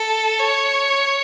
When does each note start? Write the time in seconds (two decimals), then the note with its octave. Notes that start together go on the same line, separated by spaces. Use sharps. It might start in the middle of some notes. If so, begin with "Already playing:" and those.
Already playing: A4
0.40 C#5